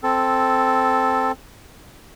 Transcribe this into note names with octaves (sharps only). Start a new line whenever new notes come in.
C4 A4